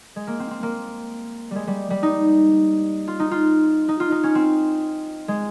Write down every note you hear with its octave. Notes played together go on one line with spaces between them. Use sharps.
G#3
A#3
C4
C4
A#3
G3 G#3
G3
G3
D#4
F4
D#4
F4
D#4
F4
D#4
C#4
C4
G#3